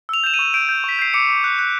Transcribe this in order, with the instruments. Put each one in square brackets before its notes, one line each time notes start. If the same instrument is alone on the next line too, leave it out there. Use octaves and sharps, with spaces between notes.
[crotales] E6 F7
G6 E7
D#7
C#6
G6 D7
G6
C#6 B6
G6 C7
D6 C#7
D6
F#6
F#6